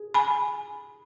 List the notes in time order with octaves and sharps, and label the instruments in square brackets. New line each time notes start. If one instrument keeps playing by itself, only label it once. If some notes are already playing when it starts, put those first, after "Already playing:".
Already playing: [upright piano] G#4
[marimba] G#5 B5